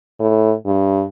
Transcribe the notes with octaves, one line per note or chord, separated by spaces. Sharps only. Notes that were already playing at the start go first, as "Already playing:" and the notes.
A2
G2